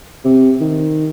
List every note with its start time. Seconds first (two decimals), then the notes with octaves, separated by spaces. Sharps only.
0.24 C3
0.61 D#3